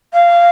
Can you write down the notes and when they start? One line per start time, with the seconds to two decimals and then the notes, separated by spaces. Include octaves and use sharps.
0.13 F5